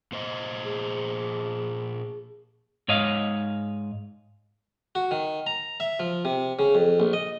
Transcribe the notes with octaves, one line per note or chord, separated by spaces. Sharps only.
A#2 C5 D#5
G#4
G#2 C#5 D#5 F5
F#4
D#3
A#5
E5
F3
C3
C#3
F2
A#1
D#5